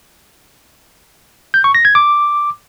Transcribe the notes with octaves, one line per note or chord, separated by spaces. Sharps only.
G6
C#6
A#6
G#6
D6